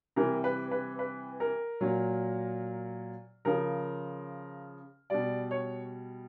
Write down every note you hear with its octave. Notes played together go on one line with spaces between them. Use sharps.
C3 E3 G3 A#4
B4
B4
B4
A#4
A#2 F#3
C#3 F3 A#4
B2 G3 D5
C#5